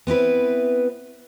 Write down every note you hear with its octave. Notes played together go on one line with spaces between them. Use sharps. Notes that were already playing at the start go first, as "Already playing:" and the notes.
B3 C4 E4 B4